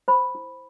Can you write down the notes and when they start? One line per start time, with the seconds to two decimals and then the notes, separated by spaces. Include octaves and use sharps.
0.08 C5 B5
0.35 E4